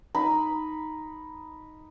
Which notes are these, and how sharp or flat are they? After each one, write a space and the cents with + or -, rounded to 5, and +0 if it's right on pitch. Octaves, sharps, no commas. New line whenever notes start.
D#4 +0 B5 +0